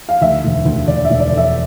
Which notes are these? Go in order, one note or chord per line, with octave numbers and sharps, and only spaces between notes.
F5
D2 E5
E1
D2
D2 D5
E5
E1
D5
D3
E5